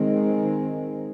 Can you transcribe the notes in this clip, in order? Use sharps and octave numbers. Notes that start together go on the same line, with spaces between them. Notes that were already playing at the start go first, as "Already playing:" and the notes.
Already playing: D#3 G#3 C4